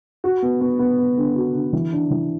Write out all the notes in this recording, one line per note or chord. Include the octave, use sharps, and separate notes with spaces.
F#4
B3
B3
B3
B3
D3
F#4
D3
E3
D4
E3